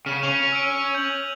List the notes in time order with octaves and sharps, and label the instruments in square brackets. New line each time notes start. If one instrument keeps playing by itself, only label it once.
[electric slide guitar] C#3 [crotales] F6 D#7
[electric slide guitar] C#4 [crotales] D#7 F7
[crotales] E6 D7
G6 F#7